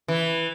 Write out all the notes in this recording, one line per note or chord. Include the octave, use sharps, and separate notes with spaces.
E3